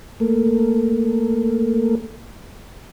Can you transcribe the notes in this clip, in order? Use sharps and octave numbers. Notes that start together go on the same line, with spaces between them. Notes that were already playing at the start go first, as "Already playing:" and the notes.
A3 A#3